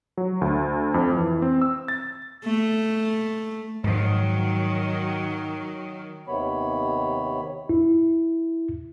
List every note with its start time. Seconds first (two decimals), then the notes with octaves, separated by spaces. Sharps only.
0.17 F#3
0.41 D2
0.94 F2
1.17 E3
1.42 C4
1.62 E6
1.88 A6
2.45 A3
3.84 G#2 D#3 F3 F#3
6.28 D#2 C3 D#3 B3 C#5 B5
7.69 E4